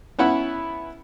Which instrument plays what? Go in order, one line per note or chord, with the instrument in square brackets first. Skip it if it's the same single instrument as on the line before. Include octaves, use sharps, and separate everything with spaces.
[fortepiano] B3 C#4 E4 F#5 B5